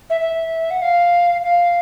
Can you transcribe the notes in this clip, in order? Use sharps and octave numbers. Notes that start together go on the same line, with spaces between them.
E5
E5
F#5
F5
F5